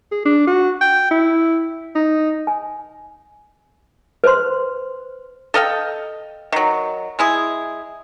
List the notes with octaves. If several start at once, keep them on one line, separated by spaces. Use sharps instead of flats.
G#4
D4
F#4
G5
E4
D#4
G#5
B4 C5 C6
A4 D#5 F5 G5
D#3 F#3
G#3 E4 G#4